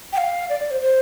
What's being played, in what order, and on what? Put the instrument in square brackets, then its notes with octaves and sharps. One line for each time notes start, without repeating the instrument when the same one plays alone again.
[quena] G5
F5
D5
D5
C5
C5